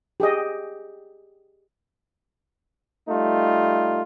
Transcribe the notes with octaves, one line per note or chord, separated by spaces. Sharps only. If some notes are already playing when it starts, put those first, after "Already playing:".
G4 G#4 D#5
G3 A3 D#4 F4